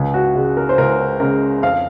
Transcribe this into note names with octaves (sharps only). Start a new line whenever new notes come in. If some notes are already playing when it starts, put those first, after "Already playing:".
Already playing: C#2
F#4
C#3 G#3
A#4
C5
C#2 A#4
C#3 G#3 A#4
F2 F5